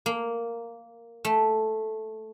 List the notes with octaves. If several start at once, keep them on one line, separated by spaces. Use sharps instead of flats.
A#3
A3